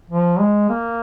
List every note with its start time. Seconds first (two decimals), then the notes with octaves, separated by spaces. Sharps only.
0.10 F3
0.39 G#3
0.70 A#3